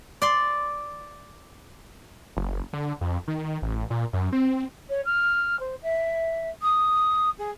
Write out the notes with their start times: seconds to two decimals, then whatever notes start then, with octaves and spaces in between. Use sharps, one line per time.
0.22 D5 C6
2.37 F#1
2.73 D3
3.01 F2
3.28 D#3
3.62 A1
3.90 A#2
4.13 F#2
4.32 C4
4.89 C#5
5.05 F6
5.60 C5
5.83 E5
6.62 D#6
7.39 G#4